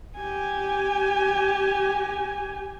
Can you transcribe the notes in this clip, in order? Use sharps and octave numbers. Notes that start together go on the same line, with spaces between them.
G4 G#5